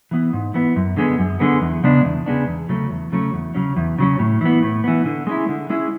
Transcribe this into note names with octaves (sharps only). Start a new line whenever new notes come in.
E3 B3
G#2
E3 B3
F#2
D3 G#3 B3
F#2
D3 G#3 B3
E2
C#3 G#3 B3 D4
E2
C#3 G#3 B3 D4
E2
C#3 F#3 A3 C#4
E2
C#3 F#3 A3 C#4
E2
C#3 F#3 C#4
E2
C#3 F#3 C#4
A2
E3 B3
A2
E3 B3
D3
G#3 C#4 E4
D3
G#3 C#4 E4